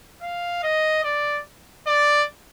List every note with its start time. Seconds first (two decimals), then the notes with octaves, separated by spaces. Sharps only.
0.22 F5
0.63 D#5
1.04 D5
1.87 D5